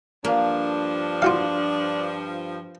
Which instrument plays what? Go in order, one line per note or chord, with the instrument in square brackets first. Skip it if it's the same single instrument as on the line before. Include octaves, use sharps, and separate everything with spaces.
[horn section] G2 F3 [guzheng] A#3 [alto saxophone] D4
[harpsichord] F4 F#4 F5